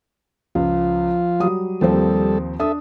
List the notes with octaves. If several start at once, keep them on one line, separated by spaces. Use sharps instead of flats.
C#2 F3 F4
F#3 G3 D#6
D#2 F3 G3 C4 A4
D4 A4 E5 D#6